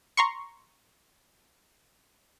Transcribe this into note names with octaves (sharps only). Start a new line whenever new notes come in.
A#5 C6 C#6